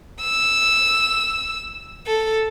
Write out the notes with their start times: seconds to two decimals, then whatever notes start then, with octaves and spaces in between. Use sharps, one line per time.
0.21 E6
2.07 A4